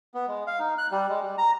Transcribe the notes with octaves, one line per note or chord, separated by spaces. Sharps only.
B3
G#3
F5
D#4
F#6
G3
G#3
G3
A#5